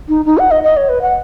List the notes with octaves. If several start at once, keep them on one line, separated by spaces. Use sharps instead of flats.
D#4
D#4
F#5
D#5
D#5
C#5
B4
F#5